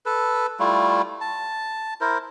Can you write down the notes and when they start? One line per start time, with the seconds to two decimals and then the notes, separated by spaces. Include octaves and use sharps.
0.06 A4 B4
0.60 G3 A3 E4 F4
1.21 A5
2.01 E4 A#4 C5